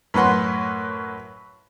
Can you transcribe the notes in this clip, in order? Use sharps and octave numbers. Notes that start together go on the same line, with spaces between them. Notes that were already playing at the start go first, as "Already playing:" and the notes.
F#2 A2 B4 F#5 C6